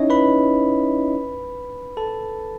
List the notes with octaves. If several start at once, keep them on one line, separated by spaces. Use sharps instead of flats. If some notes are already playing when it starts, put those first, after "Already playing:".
Already playing: C#4 D#4 E4 C#5 D#5 E5
B4 B5
A4 A5